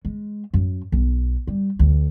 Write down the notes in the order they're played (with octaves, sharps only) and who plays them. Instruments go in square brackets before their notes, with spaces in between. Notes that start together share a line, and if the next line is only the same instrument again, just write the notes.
[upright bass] G#3
F#2
B1
G3
D2